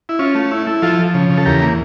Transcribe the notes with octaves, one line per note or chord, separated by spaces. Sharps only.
E4
C#4 F4
A3
E4
E4
F3 F4 A4
F3
C#3
C#3
A4
E2 G4 A#4
A#3